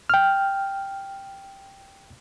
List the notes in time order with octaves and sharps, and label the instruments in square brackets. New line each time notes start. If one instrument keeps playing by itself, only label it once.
[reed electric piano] G5 F6